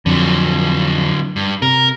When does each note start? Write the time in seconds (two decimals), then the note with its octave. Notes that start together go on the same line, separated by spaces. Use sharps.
0.06 F2 D3 F#3
1.36 G2
1.62 C3 A#4